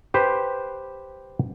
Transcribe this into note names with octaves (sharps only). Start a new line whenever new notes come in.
G4 B4 C5